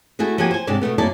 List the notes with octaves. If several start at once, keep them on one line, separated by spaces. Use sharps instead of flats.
A3 E4 F#4 G#4
F3 A#3 F#4 G4 G#5
C5 G#5
G#2 C3 D4 G4 D5 A5
B2 D#3 A3 B3
F#2 A#3 E4 D5 A5